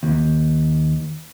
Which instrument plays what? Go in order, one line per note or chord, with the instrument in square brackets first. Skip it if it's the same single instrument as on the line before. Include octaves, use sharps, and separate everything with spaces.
[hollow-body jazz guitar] D#2